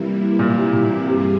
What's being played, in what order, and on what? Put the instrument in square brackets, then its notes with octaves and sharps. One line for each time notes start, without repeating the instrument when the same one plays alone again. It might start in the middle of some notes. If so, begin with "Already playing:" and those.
Already playing: [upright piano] C3 [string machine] E3 G3 A#3 E4
[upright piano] A#2
C3
A#2
C3
[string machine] G2 G3 C4 F4 G#4 [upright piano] C3